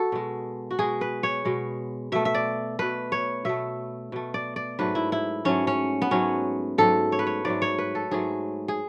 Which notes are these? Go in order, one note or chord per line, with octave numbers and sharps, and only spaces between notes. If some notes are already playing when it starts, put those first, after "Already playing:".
Already playing: F#4 A4
B2 G#3
F#4
B2 G#3 G#4
B4
C#5
B2 G#3
B2 A3 E5
E5
D5
B2 A3 B4
C#5
B2 A3 E5
B2 A3
D5
D5
G#2 F#3 A3 B4
E4
E4
G#2 F#3 A3 C#4
C#4
B3
G#2 F#3 A3 C#4
G#2 F#3 A3 A4
C#5
B4
C#5
G#2 F#3 A3 D5
C#5
B4
A4
G#2 F#3 A3 G#4
G#4